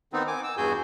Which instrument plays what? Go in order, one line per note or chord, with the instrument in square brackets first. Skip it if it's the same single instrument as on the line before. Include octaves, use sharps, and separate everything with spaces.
[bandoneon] D#3 B3 C4 D#4
G#5 D6
E6
E2 G2 F#4 G#4 G#5 G6